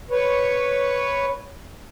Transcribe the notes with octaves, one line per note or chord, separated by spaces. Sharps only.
B4 C#5